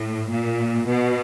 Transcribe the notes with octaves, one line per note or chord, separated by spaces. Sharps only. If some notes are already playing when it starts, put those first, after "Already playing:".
Already playing: A2
A#2
B2